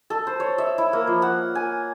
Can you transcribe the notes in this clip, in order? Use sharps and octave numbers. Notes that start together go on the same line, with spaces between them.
A4
C5
C#5
E5
E4
A#3
F3
F#5
G#5